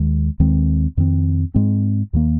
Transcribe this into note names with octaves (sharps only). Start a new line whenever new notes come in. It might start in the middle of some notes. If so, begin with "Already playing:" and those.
Already playing: D#2 D#3 G#3
D#2 D#3 G#3 C4
F2 D#3 C4
G#2 G#3 C4
D#2 D#3 A#3